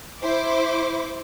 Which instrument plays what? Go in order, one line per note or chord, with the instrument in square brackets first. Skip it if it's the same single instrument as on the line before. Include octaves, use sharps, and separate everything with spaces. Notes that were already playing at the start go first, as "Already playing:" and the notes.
[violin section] E4 C5 D6